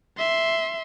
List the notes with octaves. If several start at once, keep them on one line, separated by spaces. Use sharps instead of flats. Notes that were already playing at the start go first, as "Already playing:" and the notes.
E5 C6